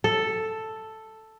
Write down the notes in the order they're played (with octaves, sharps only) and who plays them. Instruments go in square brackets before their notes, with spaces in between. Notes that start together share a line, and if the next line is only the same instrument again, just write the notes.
[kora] A4